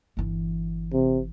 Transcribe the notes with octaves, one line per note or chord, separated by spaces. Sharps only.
G1 E3
C3